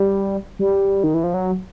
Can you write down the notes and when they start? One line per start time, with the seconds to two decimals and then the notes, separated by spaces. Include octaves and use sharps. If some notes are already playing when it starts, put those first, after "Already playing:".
Already playing: G3
0.59 G3
1.04 D#3
1.14 E3
1.24 F3
1.34 F#3